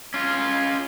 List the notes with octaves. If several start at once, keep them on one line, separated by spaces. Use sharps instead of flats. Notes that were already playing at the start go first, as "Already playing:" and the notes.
C#4 F4